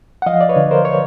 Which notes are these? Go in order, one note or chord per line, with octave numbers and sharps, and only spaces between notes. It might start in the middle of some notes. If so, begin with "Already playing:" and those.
F#5
F3 D#5 F5
D5
B4 C#5
D3
A#4 C5
C#5